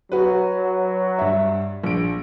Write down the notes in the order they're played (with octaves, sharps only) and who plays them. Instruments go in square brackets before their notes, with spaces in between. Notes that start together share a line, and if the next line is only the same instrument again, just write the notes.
[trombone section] F#3 [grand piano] F#4 B4
[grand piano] G2 E5
A#1 D7